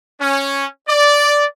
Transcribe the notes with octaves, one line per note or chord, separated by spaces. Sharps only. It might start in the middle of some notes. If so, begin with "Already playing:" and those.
C#4
D5